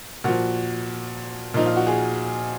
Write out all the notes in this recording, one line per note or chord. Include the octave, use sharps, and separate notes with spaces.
A#2 F3 F#4
A#2 F3 D#4
F4
F#4
G#4